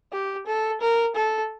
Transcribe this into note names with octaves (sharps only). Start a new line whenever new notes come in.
G4
A4
A#4
A4